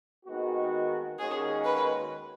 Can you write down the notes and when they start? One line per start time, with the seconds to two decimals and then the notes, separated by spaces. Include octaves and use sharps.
0.25 D#2 D#3 G#3 B3 F#4
1.18 D#2 D#3 G#3 C#4 F#4 G#4
1.65 B4